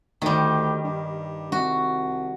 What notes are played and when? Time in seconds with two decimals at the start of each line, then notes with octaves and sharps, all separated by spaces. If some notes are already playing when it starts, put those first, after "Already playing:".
0.22 D2 D#3 G3
0.84 G2
1.52 C2 F#4